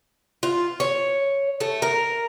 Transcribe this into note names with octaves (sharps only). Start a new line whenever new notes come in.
F4
C#5
A3
A#4